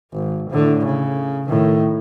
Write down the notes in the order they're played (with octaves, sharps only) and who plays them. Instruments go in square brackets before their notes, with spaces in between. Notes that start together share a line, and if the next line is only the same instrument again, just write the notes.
[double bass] G#1
A2 D3
C#3
A2 D#3